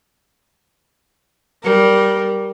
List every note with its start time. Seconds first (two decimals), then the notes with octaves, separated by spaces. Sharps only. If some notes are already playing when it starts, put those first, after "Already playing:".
1.64 G3 A#4